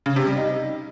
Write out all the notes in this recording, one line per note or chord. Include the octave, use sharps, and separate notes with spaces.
C#3
C3
G3
D#4